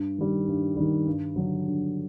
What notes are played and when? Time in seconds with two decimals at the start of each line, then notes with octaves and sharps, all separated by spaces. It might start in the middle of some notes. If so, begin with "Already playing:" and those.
Already playing: G2
0.18 D#3 G3
0.47 G2
0.77 D#3 G3
1.07 G2
1.36 D3 F#3
1.66 G2